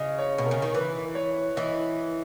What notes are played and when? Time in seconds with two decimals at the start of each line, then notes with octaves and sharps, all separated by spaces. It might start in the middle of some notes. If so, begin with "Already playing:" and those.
Already playing: C#3 D#5
0.19 C#5
0.38 B2
0.46 A#4
0.51 C#3
0.62 D#3
0.74 E3 B4
1.15 C#5
1.56 E3 D#5